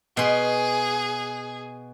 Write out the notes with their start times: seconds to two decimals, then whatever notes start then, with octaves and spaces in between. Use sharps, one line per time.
0.17 B2 G#4 C6